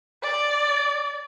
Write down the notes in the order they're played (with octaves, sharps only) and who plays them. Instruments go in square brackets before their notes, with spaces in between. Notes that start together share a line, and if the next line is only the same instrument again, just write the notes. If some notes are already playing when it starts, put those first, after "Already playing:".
[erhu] D5